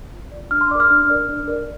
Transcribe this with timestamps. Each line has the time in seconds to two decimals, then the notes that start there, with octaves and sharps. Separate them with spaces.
0.13 F4
0.32 D5
0.51 D4 F6
0.61 C6
0.71 D5 D6
0.75 A#4 F6
0.90 D4
1.09 A#4 D5
1.29 D4
1.48 A#4 D5